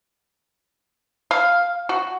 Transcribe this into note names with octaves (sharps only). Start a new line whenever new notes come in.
F5
F#4